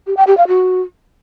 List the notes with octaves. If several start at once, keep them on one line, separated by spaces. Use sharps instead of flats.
G4
G5
G4
F5
F#4